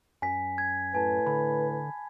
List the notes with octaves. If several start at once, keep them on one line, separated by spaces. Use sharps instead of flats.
F#2 G#5 B6
G#6
A2 B4 G#5 A5
D3 B5